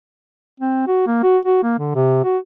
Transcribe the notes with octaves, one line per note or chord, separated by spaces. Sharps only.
C4
F#4
A#3
F#4
F#4
A#3
D3
C3
F#4